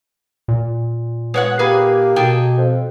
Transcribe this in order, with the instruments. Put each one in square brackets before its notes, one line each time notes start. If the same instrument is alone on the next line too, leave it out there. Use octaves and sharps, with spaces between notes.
[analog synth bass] A#2
[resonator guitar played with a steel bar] G#3 C#5 F#5 [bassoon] B3
[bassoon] A#3 [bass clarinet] G4 [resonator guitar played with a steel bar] G#4 B4
[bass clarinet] B2 [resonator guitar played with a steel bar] G#4 A4 G5
[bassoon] F2